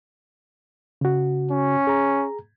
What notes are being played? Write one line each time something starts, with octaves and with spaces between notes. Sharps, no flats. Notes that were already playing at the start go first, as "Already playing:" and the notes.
C#3 F#4
C#4
G#4 A#5